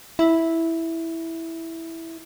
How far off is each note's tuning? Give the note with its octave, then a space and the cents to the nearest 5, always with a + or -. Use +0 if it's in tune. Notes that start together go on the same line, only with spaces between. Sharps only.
E4 -5